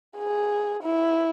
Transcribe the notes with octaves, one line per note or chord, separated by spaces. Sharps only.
G#4
E4